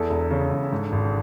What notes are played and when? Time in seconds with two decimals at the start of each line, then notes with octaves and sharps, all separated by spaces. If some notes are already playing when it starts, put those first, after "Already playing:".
Already playing: E2 A4
0.10 E1
0.31 C#3
0.51 E1
0.72 G#2
0.92 G#1